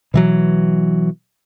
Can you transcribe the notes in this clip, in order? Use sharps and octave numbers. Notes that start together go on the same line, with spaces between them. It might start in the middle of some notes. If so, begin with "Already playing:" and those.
B2 E3 F#3